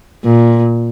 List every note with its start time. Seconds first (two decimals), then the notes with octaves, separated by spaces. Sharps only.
0.25 A#2